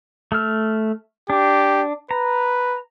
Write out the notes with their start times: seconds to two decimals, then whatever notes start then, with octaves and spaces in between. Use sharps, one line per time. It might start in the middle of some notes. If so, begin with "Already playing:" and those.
0.32 A3 E6 F6
1.30 D4 G4
2.11 B4 A#5